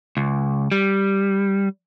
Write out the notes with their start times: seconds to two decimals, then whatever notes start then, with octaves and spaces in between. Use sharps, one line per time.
0.17 C#2
0.71 G3